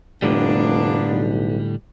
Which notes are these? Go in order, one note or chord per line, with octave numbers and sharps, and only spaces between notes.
F1 A2 D3 G3 A#3 B3 D4
B1